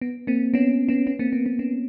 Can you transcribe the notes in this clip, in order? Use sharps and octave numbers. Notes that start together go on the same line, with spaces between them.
B3
A#3 C4
B3 C#4
B3 C#4
B3 C#4
A#3 C4
B3
A#3 C4
B3 C#4